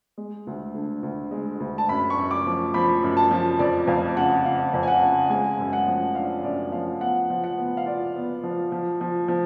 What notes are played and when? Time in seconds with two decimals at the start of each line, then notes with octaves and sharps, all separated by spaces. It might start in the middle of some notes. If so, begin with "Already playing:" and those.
0.18 G#3
0.47 D2
0.75 D3
1.03 D2
1.31 G#3
1.60 D2
1.78 A5
1.89 F#2 B5
2.10 C#6
2.17 F#2
2.31 D6
2.46 F3
2.74 F3 B5
3.03 F#2
3.17 A5
3.31 F3
3.59 F2 D5
3.87 F2 F5
4.17 C#3 F#5
4.45 C#3 F5
4.74 F2
4.83 G#5
4.88 F#5
5.02 C#3
5.30 G#3 G#5
5.59 F#2
5.73 F#5
5.87 F3
6.15 D4 F5
6.43 F#2 D5
6.72 F3 F5
7.01 B3 F#5
7.30 F3
7.44 F#5
7.57 B3
7.77 F5
7.86 F4 D5
8.15 B3
8.43 F3
8.72 F3
9.01 F3
9.28 F3